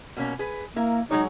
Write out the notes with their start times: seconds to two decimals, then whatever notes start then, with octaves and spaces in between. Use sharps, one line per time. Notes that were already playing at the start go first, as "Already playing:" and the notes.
0.17 B2 A#3 C#4
0.39 G#4 B4
0.76 A#3 E4 A#4
1.11 F#3 G#3 D#4 C#5